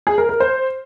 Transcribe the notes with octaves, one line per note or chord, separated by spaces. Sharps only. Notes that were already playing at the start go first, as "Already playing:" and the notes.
G#4
A#4
A#4
C5